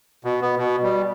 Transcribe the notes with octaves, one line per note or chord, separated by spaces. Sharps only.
B2
B3
B2
G3